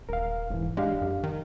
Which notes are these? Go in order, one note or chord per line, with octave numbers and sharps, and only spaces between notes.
D#1 A#4 F5
E1 G#2 E3
G#3 D4 G4 F5
F#2
D#3